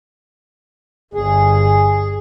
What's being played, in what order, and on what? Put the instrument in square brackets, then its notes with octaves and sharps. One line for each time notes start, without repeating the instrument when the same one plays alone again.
[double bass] G1 [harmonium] G#4